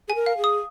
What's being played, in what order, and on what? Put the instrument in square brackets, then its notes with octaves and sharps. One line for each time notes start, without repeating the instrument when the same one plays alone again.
[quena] G#4 [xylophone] G#5
[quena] A#4
[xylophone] F5
[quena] G#4
[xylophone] D#6